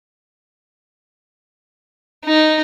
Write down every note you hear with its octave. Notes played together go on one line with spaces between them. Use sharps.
D#4